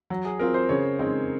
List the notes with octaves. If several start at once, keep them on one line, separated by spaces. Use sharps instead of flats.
F#3
G#4
C4 F4 A#4
C5
C#3 C#5
G#3 C4 D#4 A#4